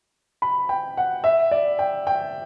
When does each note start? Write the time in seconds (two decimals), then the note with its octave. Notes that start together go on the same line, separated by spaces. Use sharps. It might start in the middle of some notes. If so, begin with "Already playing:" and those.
0.42 B5
0.69 G5
0.97 F#5
1.24 E5
1.51 D5
1.79 G5
2.07 G5